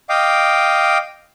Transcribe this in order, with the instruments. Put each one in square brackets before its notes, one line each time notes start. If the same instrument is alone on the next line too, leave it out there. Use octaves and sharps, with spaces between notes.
[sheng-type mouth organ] D#5 F5 G5 D6